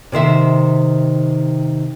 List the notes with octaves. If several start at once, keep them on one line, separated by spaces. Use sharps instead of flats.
C3 D#3 C5 E5